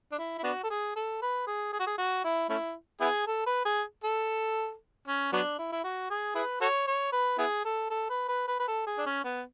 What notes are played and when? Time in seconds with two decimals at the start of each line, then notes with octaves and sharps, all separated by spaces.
0.12 D4
0.18 E4
0.38 E4
0.44 B3 D4 F#4
0.64 A4
0.70 G#4
0.96 A4
1.22 B4
1.47 G#4
1.73 G#4
1.79 F#4
1.87 G#4
1.98 F#4
2.24 E4
2.49 A3 C#4 E4
3.01 B3 E4 G#4
3.27 A4
3.46 B4
3.65 G#4
4.04 A4
5.08 C#4
5.33 F#3 B3 D4
5.59 E4
5.72 E4
5.84 F#4
6.10 G#4
6.35 E4 G#4 B4
6.61 F#4 A4 C#5
6.87 C#5
7.12 B4
7.38 B3 E4 G#4
7.65 A4
7.90 A4
8.10 B4
8.28 B4
8.48 B4
8.60 B4
8.68 A4
8.87 G#4
8.98 D4
9.06 C#4
9.24 B3